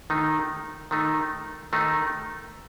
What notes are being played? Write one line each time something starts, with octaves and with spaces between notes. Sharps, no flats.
D#3 A3 D#4
D#3 A3 D#4
D#3 A3 D#4